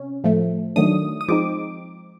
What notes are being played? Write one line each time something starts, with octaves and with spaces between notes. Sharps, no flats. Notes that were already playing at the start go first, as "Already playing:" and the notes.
Already playing: C3 C#4
A2 F3 A3
D#3 F#3 A3 D4 D#6
D#6
F3 G#3 C4 D#4 D6